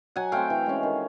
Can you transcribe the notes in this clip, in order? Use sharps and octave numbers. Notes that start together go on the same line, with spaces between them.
F#3 F#5 G#5
A3 C4 F5 G5
E3
G#3 C#4
D#3